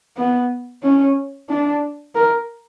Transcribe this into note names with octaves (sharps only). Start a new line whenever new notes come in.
B3
C#4
D4
A#4